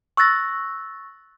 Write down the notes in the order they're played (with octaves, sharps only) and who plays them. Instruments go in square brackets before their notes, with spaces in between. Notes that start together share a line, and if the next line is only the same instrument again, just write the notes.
[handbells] C#6 E6 F#6 A6 A#6